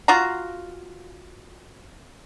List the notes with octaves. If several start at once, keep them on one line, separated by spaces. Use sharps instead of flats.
F4 F#4 F5 A#5